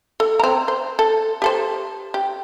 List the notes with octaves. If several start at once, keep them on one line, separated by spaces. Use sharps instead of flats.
A4
C4 A#5
C5
A4
G4 A4 C5
G4